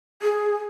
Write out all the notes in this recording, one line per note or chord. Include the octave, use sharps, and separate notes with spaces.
G#4